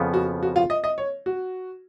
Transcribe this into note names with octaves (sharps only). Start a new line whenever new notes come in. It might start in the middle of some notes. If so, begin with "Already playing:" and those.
Already playing: F2 C#3 F3 B3
F#4
F#4
F4
D#5
D#5
C#5
F#4